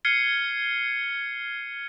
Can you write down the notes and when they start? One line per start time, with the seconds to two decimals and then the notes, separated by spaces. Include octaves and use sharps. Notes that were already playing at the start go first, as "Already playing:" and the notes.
0.05 F6 G#6 C7 C#7 D#7 G7